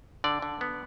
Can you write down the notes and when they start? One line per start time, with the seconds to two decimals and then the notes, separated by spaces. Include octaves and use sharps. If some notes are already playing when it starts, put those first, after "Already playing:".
0.24 D3 D5
0.42 D3
0.61 B3